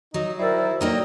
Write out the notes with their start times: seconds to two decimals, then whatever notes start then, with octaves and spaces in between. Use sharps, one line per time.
0.14 F#3 D#4
0.39 E4 A#4 C5 D5 G5 E6
0.81 A2 F#3 A#3 D#4 D5 D#5 G5 D#6